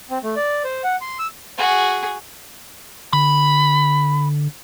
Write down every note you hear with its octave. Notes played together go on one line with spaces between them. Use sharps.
C4
A3
D5
C5
F#5
C6
E6
F#4 G#4
D3 B5